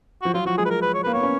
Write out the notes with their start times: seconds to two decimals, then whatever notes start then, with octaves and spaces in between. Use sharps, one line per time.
0.22 F3 F#4
0.34 F#3 F4
0.45 F3 F#4
0.58 G#3 G#4
0.65 B4
0.70 A#4
0.82 B4
0.94 C#5
1.04 A#3 B4
1.13 B3 C#5
1.23 C#4